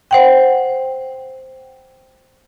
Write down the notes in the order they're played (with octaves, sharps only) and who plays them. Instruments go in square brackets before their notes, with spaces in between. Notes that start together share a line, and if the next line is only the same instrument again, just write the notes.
[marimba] C5 F#5 G5